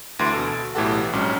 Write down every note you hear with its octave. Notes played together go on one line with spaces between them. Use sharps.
D2 E3 C6 A6 D7
B2 A4
B1 A2 E3 G4 A4 F#5
A#1 G#2 F#3 C#4